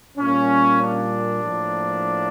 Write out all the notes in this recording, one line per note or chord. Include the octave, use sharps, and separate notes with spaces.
A#2 G3 A#3 C#4
D4
A2 F3 A#3